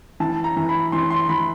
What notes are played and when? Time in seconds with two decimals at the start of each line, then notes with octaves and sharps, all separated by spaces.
0.20 E3 A5
0.44 A#5
0.57 E3
0.69 B5
0.92 E3 C6
1.10 C6
1.29 E3 B5